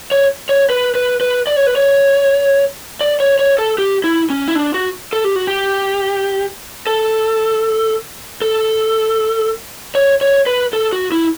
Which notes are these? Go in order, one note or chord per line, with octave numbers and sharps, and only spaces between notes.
C#5
C#5
B4
B4
B4
D5
C#5
B4
C#5
D5
C#5
C#5
A4
G4
E4
C#4
E4
D4
F#4
A4
G4
F#4
G4
A4
A4
C#5
C#5
B4
A4
F#4
E4